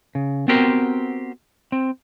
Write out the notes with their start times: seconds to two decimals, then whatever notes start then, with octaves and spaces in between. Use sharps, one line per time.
0.15 C#3
0.48 B3 C4 F#4 G4 A#4 C5
1.72 C4